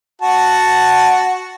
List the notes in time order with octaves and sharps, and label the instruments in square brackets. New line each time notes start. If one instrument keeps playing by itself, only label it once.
[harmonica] F#4 F#5 A5